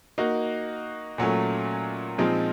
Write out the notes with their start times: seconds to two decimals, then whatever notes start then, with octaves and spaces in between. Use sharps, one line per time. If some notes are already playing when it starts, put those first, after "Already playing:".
0.18 A#3 D#4 F#4
1.18 A#2 F#3 A3 C#4
2.18 A#2 F3 G#3 C4 D#4